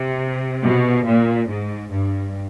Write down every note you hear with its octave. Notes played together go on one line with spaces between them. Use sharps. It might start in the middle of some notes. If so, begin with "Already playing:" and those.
Already playing: C3
B2
A#2
G#2
G2